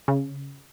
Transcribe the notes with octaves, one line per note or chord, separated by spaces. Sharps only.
C#3